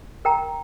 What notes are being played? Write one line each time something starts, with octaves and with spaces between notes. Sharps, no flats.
A#4 G5 A#5